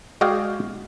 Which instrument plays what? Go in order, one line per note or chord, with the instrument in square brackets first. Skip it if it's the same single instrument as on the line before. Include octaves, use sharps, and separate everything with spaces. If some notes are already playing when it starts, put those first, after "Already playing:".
[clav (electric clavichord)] G#3 F#4 G#4 D5 F5 G5